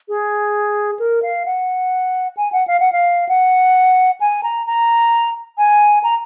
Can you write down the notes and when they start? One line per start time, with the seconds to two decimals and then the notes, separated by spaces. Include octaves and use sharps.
0.09 G#4
0.99 A#4
1.23 F5
1.45 F#5
2.37 G#5
2.52 F#5
2.68 F5
2.80 F#5
2.93 F5
3.29 F#5
4.21 G#5
4.43 A#5
4.67 A#5
5.58 G#5
6.04 A#5